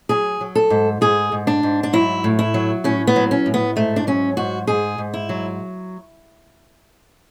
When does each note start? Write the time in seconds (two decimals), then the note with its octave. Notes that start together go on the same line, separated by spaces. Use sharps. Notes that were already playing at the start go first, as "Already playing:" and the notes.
0.09 F#3 G#4
0.41 F#3
0.55 A4
0.70 G#2
1.01 G#2 G#4
1.32 G#2
1.47 D4
1.63 G#2
1.83 D4
1.93 F#3 E4
2.24 A2
2.39 E4
2.54 F#3
2.84 A2 C#4
3.07 B3
3.16 F#3
3.31 C#4
3.46 A2
3.54 B3
3.76 G#2 A3
3.96 D4
4.07 F#3 C#4
4.37 G#2 F#4
4.67 G#2 G#4
4.98 G#2
5.14 E4
5.29 F#3